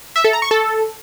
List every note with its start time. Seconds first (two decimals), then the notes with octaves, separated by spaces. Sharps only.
0.16 E5
0.24 A4
0.33 A#5
0.42 C#6
0.51 A4